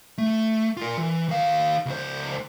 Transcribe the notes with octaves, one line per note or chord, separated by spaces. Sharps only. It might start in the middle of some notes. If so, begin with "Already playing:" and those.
A3
F4 A#4
E3
D#3 F5
C#2 C5